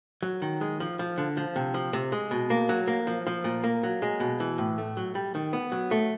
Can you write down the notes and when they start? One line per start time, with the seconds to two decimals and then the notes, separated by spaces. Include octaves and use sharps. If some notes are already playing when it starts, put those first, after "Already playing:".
0.23 F#3
0.42 D#3
0.61 G#3
0.80 F3
0.99 F3
1.18 D3
1.37 F3
1.56 C3
1.74 F3
1.93 C3
2.12 G#3
2.31 B2
2.50 A#3
2.69 F#3
2.88 A#3
3.07 F3
3.27 F3
3.44 A#2
3.64 A#3
3.83 F#3
4.02 G#3
4.20 B2
4.40 E3
4.58 A2
4.78 A3
4.97 F#3
5.15 G3
5.35 D#3
5.53 B3
5.72 F#3
5.91 A3